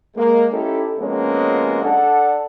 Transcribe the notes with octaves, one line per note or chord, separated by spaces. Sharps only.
G#3 A#3
C#4 D#4 E4 G4 A4
C3 F3 G#3 A#3 B3 C#4
D4 A4 F#5